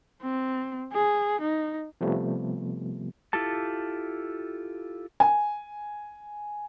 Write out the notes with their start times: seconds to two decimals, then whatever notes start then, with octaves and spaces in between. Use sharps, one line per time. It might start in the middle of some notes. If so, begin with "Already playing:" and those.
0.22 C4
0.92 G#4
1.41 D#4
2.01 C3 F3 G3 A3 B3
3.33 E4 F4 G4 A4 A5
5.20 G#5